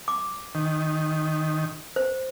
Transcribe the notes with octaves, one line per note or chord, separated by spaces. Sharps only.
D6
D#3
C5